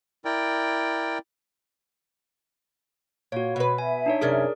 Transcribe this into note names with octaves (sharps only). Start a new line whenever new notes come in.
E4 A#4 D5 G5
A#2 F#4 C#5
B2 B4
E5 G#5
D4 D#4 C#5
F#2 C3 C#4 G#4 A#4 D5